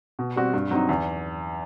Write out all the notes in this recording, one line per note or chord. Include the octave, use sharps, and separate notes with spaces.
B2
G3 C4 F#4
G2
F#3 C4 D#4
E2